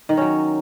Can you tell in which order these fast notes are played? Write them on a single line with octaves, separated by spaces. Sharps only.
D#3 D#4 C#4 F#3